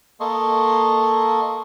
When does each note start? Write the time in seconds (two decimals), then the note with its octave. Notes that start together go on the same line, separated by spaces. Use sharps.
0.20 A#3 A4 D#5 C6 C#6